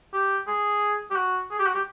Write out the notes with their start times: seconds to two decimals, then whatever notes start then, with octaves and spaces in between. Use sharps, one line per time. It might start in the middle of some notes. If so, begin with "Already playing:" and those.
0.13 G4
0.47 G#4
1.11 G4
1.15 F#4
1.51 G#4
1.59 G4
1.66 F#4
1.75 G4